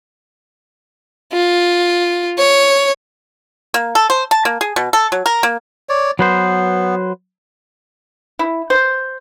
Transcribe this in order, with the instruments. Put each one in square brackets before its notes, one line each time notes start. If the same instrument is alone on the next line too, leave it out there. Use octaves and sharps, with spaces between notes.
[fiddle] F4
C#5
[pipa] A#3
A4
C5
A5
A#3
G#4
B2
A4
F#3
A#4
A#3
[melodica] C#5 D5
[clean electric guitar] F#3 B4 C5 [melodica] B3
[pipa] E4
C5